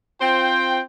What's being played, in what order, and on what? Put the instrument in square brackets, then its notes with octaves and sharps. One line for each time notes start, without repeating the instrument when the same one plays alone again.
[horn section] C4 F4 C5 G5